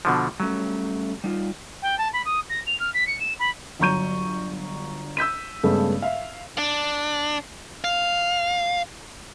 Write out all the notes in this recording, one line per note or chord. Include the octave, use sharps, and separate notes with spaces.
B2 D3 F3
F#3 G3 A3 C#4
G3 D#4 F4
G5
A5
B5
D#6
A#6
F7
F6
B6
C#7
E7
B5
G1 F#3 A#5 C#6 G6 D#7
E6 G6 B6 D#7
G2 C#3 G#3 A3 B3
E5 F5
D4
F5